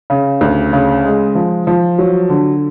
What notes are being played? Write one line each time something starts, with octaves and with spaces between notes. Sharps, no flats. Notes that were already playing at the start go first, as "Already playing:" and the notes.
C#3
D2
C#3
G#3
F3
F3
F#3
D3